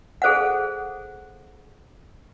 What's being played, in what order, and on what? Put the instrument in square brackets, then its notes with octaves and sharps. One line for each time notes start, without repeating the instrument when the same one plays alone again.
[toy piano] G#4 A4 C5 F5 F#5